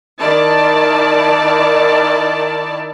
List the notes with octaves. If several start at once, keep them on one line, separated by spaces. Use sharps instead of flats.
D#3 E4 D5 A5